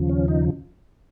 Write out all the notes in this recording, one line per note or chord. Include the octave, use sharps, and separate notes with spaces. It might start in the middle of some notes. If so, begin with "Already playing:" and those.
Already playing: D#2 C#3 F3
C#4
D#4